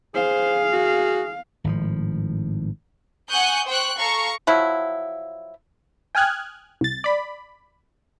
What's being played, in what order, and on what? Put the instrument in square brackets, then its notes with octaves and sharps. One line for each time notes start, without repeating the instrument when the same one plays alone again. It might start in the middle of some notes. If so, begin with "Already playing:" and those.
[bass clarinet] G#4 [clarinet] C5 [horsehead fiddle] F5
[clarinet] F#4
[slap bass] G#1 A2 D#3 F3
[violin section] F#5 G#5 C#6 D#6 F#6 G6
C5 G5 C#6 F#6
A4 F5 A#5 C#6
[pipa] F3 F#3 E4
[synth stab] G5 G#5 D#6 F6 F#6 G#6
C2 A6
D5 B5